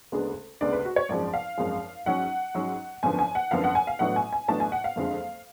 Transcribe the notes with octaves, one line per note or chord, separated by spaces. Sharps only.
D2 C#3 G#3 B3 D4
D2 C#3 G#3 B3 D4 D5
B4
F#4
C#5
G#1 F#2 F3 G#3 D5
F5
G#1 F#2 F3 G#3
G#2 F#3 C#4 F#5
G#2 F#3 C#4
G#1 F#2 D3 F3 B3 G#5
G#5
F#5
G#1 F#2 D3 F3 B3 F5
F#5
G#5
F5
A1 A2 F#3 B3 D4 F#5
G#5
G#5
A1 A2 F#3 B3 D4 A5
G#5
F#5
F5
F#1 F2 D3 G#3